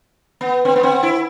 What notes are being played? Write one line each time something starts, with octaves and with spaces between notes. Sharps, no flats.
B3
C4
B3
C4
E4